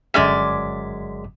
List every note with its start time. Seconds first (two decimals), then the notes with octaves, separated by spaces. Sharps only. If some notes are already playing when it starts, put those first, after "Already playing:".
0.14 G1 F#2 G#3 D5 B6